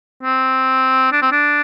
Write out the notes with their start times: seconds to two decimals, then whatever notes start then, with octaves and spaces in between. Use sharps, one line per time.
0.23 C4
1.12 D4
1.22 C4
1.32 D4